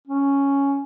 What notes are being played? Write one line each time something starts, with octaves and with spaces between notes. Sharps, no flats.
C#4